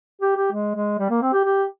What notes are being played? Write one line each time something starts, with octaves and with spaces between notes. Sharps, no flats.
G4
G4
G#3
G#3
G3
A#3
C4
G4
G4